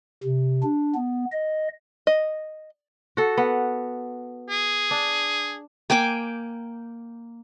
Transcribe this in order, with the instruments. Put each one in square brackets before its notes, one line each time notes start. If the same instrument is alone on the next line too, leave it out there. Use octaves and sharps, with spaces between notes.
[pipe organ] C3
D4
B3
D#5
[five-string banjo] D#5
[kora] F#4 A4
B3
[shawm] G#4
[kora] D4
[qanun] A#3 G5 G#5 D6